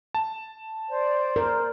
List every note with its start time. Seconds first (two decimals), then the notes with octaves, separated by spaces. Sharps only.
0.14 A5
0.89 C5 D5
1.36 A#4